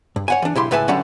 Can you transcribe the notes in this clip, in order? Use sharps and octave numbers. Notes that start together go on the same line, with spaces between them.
G2
C#5 F#5 G#5
E3 D4
B1 E4 G4 C6
C#2 A2 B4 E5 G#5 A5
D3 F#3 G3 A3 C#4 F#5